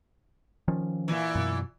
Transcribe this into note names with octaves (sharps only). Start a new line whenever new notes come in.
D#3 F3 C#4
A#2 E3
F#2 B2